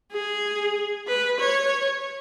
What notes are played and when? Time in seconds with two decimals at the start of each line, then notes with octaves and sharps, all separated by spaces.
0.13 G#4
1.08 B4
1.40 C#5